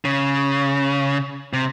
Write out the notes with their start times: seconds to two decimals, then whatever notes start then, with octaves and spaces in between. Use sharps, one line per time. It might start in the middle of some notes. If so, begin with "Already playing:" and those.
0.05 C#3
1.53 C3